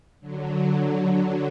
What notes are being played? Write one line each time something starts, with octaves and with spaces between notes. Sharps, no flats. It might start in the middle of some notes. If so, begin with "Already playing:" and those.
D3 F#3